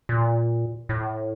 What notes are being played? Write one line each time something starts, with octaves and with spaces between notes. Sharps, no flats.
A#2
A2